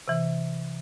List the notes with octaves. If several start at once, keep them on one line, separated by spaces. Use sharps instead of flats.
C3 E3